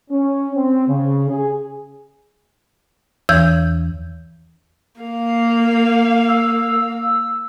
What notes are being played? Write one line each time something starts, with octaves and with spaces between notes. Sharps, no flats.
C#4
C4
C#3
G#4
E2 E3 G6 G#6
A#3 F5
E6